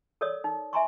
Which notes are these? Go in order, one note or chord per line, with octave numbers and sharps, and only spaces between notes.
A4 A#4 C#5 D5 D#6
D#4
E5 G#5 A#5 C6 C#6